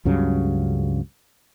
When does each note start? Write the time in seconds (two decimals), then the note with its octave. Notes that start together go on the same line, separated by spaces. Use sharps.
0.05 C#2 G2 C#3 F#3